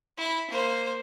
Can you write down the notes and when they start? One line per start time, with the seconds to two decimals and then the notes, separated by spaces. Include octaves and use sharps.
0.18 E4 B5
0.50 A#3 C5